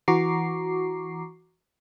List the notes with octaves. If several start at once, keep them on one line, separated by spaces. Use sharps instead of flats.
E3 F#4 A#5 C#6 D6 C7